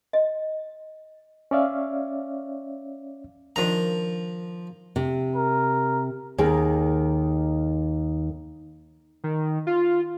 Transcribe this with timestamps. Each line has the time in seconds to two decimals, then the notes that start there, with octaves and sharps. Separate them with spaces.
0.13 D#5
1.51 C#4 C#5 D5 E5 F5
3.56 D#3 F3 D4 A#5
4.96 C3
5.36 A#4
6.38 D#2 D#3 G#4 A#4
9.24 D#3
9.67 F4